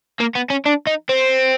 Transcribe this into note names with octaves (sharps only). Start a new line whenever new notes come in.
A#3
B3
C#4
D4
D#4
C4